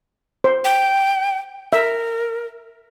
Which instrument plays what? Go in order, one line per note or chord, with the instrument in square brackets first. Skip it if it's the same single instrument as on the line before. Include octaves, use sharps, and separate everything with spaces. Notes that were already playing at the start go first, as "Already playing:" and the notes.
[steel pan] C5
[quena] G5
[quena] A#4 [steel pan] E5